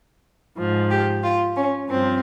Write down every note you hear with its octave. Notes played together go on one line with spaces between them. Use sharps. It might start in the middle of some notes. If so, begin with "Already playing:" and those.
G#2 F3
G4
F4
C#4
G2 F3 C4